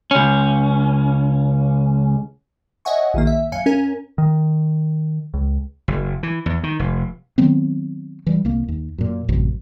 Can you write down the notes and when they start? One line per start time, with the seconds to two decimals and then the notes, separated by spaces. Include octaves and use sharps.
0.11 C#2 C#4
2.85 C#5 D#5 E5 F#5 G#5 C#6
3.14 A#1 D#3 A#3
3.27 E5
3.52 F#2 F5 G#5 C#7
3.66 C#4 A#4 G#5
4.18 D#3
5.34 C#2
5.88 F#1
6.23 E3
6.46 E2
6.63 D#3
6.79 F1
7.38 D#3 F#3 B3 C4
8.27 E3 G3
8.45 C2 A#3
8.68 D#2
8.98 F#2 A#2
9.29 A1 F#2 C3